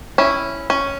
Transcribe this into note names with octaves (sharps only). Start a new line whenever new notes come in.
C#4 E4
C#4